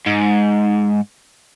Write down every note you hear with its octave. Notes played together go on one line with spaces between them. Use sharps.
G#2